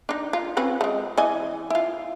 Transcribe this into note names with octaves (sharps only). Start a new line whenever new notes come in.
D4 D#4
F4
C4 C#4 B4
G#3 A3
E3 D#5 G#5
E4 F4